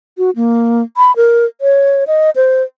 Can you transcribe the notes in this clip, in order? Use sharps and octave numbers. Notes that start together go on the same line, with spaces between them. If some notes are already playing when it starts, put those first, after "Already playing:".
F#4
A#3
B5
A#4
C#5
D#5
C5